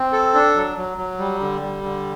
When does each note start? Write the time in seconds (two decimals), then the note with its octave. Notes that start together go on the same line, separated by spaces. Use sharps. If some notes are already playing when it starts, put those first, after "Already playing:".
Already playing: C4
0.13 A4
0.34 D4
0.55 F#3
0.77 F#3
0.98 F#3
1.19 G3
1.40 D3
1.61 G3
1.83 D3